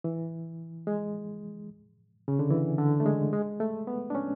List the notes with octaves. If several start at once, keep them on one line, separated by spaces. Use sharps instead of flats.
E3
G#3
C#3
D3
E3
D3
A3
G#3
G#3
A3
B3
D4
C#4